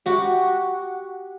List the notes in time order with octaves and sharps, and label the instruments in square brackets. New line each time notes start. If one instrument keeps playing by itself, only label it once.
[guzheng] F#4 G4